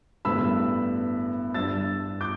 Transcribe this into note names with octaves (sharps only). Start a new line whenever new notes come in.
A1 G2 D3 G3 B3 B5 E6
G1 G2 G3 D4 E6 A6
D6 G6